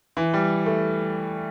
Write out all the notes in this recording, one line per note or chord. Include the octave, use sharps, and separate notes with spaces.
E3
G3
A3